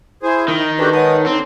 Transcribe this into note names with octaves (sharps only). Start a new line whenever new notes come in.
E4 G#4 C5
D#3 D#4
D4 F#4 G4 A4 B4 A5
G#3 B3 C#5 F#5 A5 D#6
D3 C4 D#4